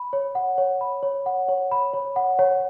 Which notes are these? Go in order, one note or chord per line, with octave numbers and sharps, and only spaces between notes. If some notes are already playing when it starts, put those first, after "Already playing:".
Already playing: B5
C#5
F#5
C#5
B5
C#5
F#5
C#5
B5
C#5
F#5
C#5